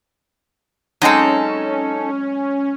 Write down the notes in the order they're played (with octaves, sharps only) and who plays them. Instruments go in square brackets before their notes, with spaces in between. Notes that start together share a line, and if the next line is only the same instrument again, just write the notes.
[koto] F#3 G#3 C4 [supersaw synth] C#4 [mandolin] D#4 A4